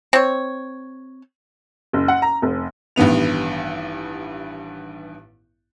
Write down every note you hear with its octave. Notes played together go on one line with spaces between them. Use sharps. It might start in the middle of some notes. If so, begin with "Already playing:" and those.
C4 C#5
F#1
F#5
A#5
F1
A1 G2 D#3 B3 F7